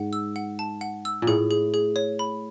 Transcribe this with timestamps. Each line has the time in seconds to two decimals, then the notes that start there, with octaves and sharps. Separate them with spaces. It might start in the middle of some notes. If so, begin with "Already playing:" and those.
Already playing: G#2 F#5
0.13 E6
0.36 F#5
0.59 A5
0.81 F#5
1.05 E6
1.22 A#2
1.27 A2 G#4
1.51 G#4
1.74 G#4
1.96 C#5
2.19 B5